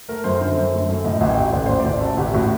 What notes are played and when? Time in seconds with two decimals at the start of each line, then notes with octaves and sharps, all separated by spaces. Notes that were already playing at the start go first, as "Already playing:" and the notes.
0.09 A3 A#4
0.24 F#2 C5
0.34 A#4
0.40 D3 C5
0.57 F#2
0.73 A3
0.89 F#2
1.05 A2 D#5
1.21 A1
1.29 G5
1.37 A3
1.53 A1 D5
1.66 A2 C5
1.80 D5
1.85 A1
2.01 A3 A4
2.17 A1 G4
2.34 A2 F#4